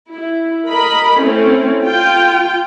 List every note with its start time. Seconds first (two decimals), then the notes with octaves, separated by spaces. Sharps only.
0.12 E4
0.69 A#4 D#5 B5
1.21 A3 C4 C#4 E4
1.83 F4 G5